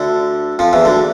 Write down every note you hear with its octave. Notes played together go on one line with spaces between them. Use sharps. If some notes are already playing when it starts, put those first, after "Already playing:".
Already playing: D2 D3
F2 F3
E2 E3
D2 D3